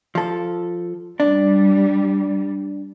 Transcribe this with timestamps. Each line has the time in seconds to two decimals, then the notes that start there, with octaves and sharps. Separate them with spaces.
0.15 F3 A4
1.20 G3 D4